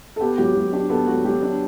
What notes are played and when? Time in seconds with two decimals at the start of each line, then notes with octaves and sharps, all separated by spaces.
0.16 A4
0.21 B3 G4
0.38 F#3 G4
0.56 F#3
0.72 D4 G4
0.90 B3 A4
1.07 F#3 F#4
1.25 F#3 G4
1.42 D4